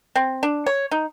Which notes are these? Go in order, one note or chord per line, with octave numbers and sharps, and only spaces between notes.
C4
D4
C#5
D#4